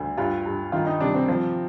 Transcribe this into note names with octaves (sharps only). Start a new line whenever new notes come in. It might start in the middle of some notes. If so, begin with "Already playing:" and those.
Already playing: D2 D3
G2 F4
G2
D#3 F4
D#4
C3 D4
C4
F3